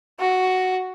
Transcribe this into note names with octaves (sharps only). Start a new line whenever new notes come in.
F#4